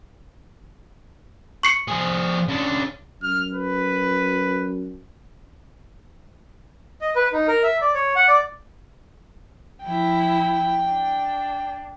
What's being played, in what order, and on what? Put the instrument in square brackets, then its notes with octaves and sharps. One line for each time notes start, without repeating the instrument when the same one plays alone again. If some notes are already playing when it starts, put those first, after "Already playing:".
[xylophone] C#6 C7 C#7
[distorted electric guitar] F3 G#4
C#3 D4
[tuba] F#2 [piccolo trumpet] F6
[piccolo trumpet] B4
[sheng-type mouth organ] D#5
B4
D#4
A#4
E5
D5
C#5
F#5
D5
[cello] F3 E4 [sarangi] G5
[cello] D4